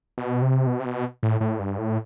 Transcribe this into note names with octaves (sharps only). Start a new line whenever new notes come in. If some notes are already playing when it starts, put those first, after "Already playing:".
B2
C3
B2
C3
B2
A2
A2
G2
A2